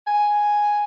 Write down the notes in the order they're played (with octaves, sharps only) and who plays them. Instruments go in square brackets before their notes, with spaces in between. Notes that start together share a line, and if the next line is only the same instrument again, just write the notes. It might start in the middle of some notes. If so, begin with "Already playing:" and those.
[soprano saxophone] G#5